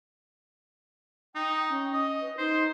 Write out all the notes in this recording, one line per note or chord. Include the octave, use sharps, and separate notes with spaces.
D#4 G5
C#4
D#5
B4
D#4 C5